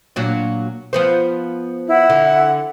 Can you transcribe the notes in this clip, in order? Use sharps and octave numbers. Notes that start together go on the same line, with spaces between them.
A#2 F#3 D4
F3 B3 C5
E4 F#5
D3